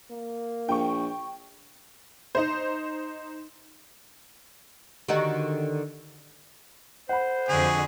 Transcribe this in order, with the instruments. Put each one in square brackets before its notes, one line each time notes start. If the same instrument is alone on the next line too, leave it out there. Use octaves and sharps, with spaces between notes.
[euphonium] A#3
[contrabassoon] A#1 [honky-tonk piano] G5 C#6
[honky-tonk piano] D#4 C5
[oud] D3 D#3 F#4 [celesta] G4 D#5 A#5
[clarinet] C5 [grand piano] F#5 B5
[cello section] F2 D3 [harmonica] F#4 G#4